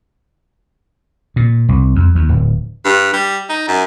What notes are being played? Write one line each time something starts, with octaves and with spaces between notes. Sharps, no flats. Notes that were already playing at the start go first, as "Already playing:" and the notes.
A#2
C2
F2
D#2
D1
G2
G3
D#4
F#2